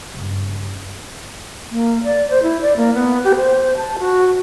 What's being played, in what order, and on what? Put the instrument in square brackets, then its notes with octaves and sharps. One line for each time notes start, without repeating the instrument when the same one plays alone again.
[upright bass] G2 C#3
[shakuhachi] A#3
D5
C5
E4
D5
A#3
B3
G4
C5
A5
F#4